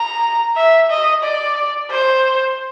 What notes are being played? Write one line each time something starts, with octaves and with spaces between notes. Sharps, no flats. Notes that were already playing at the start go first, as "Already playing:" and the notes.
Already playing: A#5
E5
D#5
D5
C5